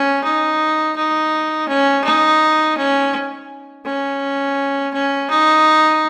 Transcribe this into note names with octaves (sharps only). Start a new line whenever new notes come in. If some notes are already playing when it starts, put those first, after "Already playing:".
Already playing: C#4
D#4
D#4
C#4
D#4
C#4
C#4
C#4
D#4